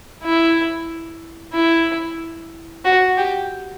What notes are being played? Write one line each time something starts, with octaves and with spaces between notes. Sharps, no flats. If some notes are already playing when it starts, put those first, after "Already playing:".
E4
E4
F#4
G4